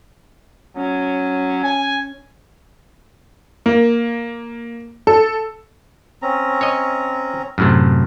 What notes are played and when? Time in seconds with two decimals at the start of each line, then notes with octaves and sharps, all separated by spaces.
0.77 F#3 C#4
1.64 G#5
3.66 A#3
5.07 A4
6.22 C4 C#4 A#5
6.61 C#5 D#5
7.58 F#2 A2 C3